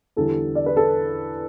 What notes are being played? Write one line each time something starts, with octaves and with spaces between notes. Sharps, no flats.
E2 D3 G3 A4
D5
B4
A4